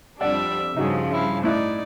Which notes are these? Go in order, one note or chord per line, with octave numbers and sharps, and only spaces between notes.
F2 G3 D4 D5 E5 F#5
G2 C#3 F3 D#4 F#4 G#4
E4 E5 F5
A2 D#4 E4 D5 F#6